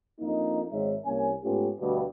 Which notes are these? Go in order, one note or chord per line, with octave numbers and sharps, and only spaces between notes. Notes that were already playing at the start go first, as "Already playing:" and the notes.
F2 A#3 D4 D#4
G#1 G#2 G#3 D#4 C#5 E5
C2 A#3 C#4 C#5 G#5
G#2 A3 B3 C#4 F4 G4
D2 G2 B2